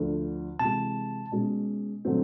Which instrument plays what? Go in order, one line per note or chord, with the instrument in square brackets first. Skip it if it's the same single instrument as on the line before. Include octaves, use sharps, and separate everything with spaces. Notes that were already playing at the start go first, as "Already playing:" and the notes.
Already playing: [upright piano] D2 D3 F3
[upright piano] C3 E3 G#3 [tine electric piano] A5
[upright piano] B2 G#3 C#4
D3 F#3 A3 C4